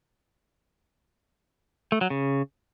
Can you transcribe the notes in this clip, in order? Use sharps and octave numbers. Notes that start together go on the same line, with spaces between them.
A3
F#3
C#3